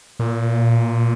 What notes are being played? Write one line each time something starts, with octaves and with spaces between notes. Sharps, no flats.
A#2